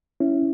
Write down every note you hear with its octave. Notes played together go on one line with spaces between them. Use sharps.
C#4 E4